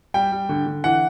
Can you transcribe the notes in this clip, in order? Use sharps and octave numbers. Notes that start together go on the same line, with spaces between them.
G3 G5
G3
D3
D3
E3 F#5